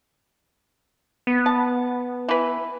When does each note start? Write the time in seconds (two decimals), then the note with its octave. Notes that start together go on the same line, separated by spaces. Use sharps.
1.27 B3
1.46 A5
2.29 E3 B4